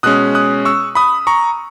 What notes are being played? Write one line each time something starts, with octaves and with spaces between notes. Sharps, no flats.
B2 G#3 C#4 D#6 F#6
D#6 F#6
C#6 E6
B5 D#6
A#5 C#6